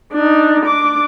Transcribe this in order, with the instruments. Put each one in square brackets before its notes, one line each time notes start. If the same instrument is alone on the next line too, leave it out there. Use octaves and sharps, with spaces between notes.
[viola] D4 D#4
D4 D6